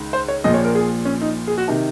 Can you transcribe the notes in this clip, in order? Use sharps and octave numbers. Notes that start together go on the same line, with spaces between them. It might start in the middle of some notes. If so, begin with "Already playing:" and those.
Already playing: C#2 D#3
C5
C#5
A#1 A#2 F3 D#5
C#5
A#4
G#4
C#4
D#4
G#4
F#4
C3 D#3